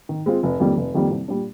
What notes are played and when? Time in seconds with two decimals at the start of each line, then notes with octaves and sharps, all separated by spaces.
0.09 D#3
0.26 G#3 C4 F4
0.43 F1
0.60 F2 D#3 G3 A#3
0.77 F1
0.94 F2 D#3 G3 A#3
1.11 C2
1.28 A#2 G3 D4